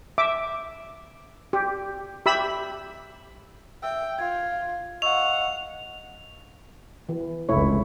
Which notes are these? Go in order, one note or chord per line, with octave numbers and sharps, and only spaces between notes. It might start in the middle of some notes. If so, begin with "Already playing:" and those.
E5 D6
G4
G4 E5 B5 E6
E5 G5 E6
F4 G#6
D#5 F5 F#5 C#6 E6 F7
E3
F1 C#2 A3 E4 C#5